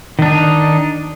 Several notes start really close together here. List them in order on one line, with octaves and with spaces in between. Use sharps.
D#3 D4 D#4